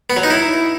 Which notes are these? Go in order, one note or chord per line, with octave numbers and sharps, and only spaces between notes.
B3
F#3
D#4
E4